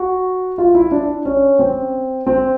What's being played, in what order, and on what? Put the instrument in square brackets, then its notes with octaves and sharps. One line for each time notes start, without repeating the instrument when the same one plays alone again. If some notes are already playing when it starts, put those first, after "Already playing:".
Already playing: [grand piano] F#4
F4
E4
D4
C#4
C4
C4